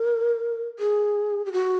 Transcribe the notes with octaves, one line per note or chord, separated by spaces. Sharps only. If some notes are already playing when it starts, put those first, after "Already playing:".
Already playing: A#4
G#4
G4
F#4